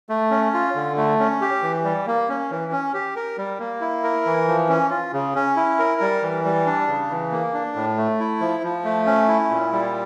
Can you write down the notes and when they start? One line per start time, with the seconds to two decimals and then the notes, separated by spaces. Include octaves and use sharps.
0.09 A3
0.31 C#4
0.54 F4
0.75 D3
0.97 A3
1.19 C#4
1.41 G4
1.63 E3
1.84 G3
2.07 A#3
2.29 C#4
2.51 E3
2.72 C#4
2.94 G4
3.16 A#4
3.38 G3
3.60 A#3
3.81 E4
4.04 A#4
4.26 E3
4.48 F3
4.69 C#4
4.90 F4
5.13 C#3
5.35 C#4
5.56 E4
5.79 A#4
6.01 G3
6.22 E3
6.45 G3
6.66 D4
6.87 C#3
7.10 E3
7.31 A#3
7.54 D4
7.75 A2
7.98 A3
8.20 E4
8.41 F3
8.64 F3
8.84 A3
9.06 C#4
9.28 E4
9.51 A#2
9.73 G3